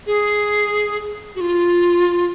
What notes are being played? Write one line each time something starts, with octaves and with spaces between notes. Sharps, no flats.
G#4
F#4
F4